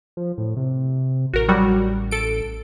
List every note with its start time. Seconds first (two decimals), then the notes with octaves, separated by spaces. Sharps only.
0.17 F3
0.38 A2
0.57 C3
1.33 A1 F#4 A#4
1.48 F#3 G3 F#4
2.11 A4 D7